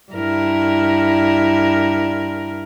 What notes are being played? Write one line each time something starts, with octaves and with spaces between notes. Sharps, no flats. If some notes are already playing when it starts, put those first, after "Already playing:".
G2 E4 A#4